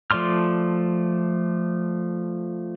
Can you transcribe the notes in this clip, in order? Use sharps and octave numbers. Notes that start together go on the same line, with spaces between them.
F3 A3 D5 C6 F6